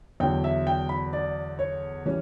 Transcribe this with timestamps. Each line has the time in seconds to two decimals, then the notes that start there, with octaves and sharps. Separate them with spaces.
0.20 E2 D3 F#3 G5
0.44 E5
0.67 G5
0.89 B5
1.13 D5
1.59 C#5
2.06 E3 G3 C#4